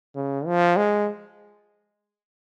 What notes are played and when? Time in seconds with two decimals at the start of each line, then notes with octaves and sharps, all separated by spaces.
0.15 C#3
0.46 F3
0.77 G#3